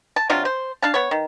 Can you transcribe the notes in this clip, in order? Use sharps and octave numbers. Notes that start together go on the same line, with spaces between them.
A5
C3 F#3 D4 F4
C5
D4 F5 A5
B3 C#5
D#3